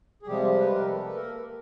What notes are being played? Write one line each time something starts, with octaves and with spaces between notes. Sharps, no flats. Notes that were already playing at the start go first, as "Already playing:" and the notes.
G#4
C3 F3 G3 G#3 G4
B4
A#4
A3 A4
B4
A#3 A#4